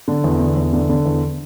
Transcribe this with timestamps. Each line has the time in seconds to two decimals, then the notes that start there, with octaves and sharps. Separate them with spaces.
0.08 D3
0.24 E2
0.40 D3
0.57 E2
0.73 D3
0.89 D3
1.05 E2